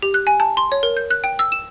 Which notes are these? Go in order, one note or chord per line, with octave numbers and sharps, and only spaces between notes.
G4
F#6
G#5
A5
C6
C#5
A#4
G6
F#6
G5
E6
E7